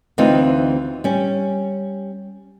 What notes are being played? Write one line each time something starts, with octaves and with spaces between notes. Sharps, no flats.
D2 E3 C4 D#4 F4
G3 C#4